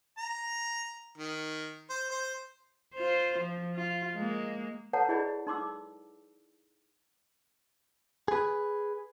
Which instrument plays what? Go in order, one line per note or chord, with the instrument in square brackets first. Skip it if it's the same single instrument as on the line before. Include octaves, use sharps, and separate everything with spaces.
[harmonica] A#5
D#3
C5
C5
[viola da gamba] F4 C5
F3
F4
G#3 A#3
[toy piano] A4 B4 C#5 F#5 A5 A#5
E4 G#4 D5 D#5 B5
D#4 C6 D6 E6
[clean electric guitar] G#4 B4